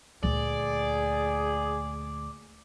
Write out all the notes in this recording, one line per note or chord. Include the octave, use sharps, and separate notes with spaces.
D2 A#2 G#4 D5